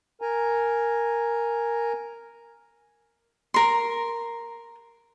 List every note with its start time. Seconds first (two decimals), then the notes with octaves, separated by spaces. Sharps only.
0.21 A#4 G#5 A#5
3.54 A#4 C6